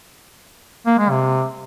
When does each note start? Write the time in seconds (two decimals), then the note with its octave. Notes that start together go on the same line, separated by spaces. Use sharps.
0.86 A#3
0.99 G#3
1.10 C3